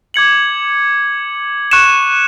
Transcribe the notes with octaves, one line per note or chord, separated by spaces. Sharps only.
D6 G#6 C#7 F#7
C#6 F#6 C#7 E7